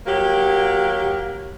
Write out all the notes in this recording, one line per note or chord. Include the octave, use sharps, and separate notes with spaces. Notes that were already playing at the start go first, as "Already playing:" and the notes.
F#3 A#3 G4